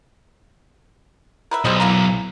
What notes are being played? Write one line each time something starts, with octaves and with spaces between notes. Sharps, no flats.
A#4 B4 E5
B1 G3 C5 D#5
E3 A#3 A#5